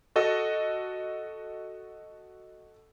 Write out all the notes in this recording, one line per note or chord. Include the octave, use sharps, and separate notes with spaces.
F#4 A4 D#5